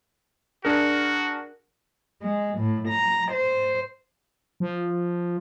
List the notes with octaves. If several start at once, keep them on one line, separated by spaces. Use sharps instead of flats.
D4 F#4 G#4 A#4
G#3
A2
A#5
C5
F3